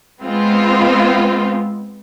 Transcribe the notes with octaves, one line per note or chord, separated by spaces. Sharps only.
G#3 B3 C4 F4